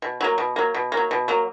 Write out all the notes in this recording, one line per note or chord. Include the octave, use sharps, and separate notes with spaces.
B2
F#3 A#3
B2
F#3 A#3
B2
A#3
F#3
B2
F#3 A#3